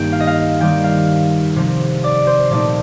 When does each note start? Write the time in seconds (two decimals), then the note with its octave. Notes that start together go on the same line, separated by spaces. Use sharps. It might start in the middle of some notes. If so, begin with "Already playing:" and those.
Already playing: G2 D#3 A#3 D#4 G5
0.12 F5
0.20 D#5
0.27 F5
0.60 D#3 G3 C4 D#4 G5
0.84 F5
1.56 C3 F3 C4
2.04 D5
2.27 C5
2.50 A#2 F3 A3 C4 D#4 D5